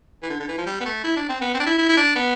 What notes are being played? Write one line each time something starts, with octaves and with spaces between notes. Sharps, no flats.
E3
D3
D3
E3
F3
G3
B3
A3
E4
D4
C4
B3
C4
D4
E4
E4
E4
D4
B3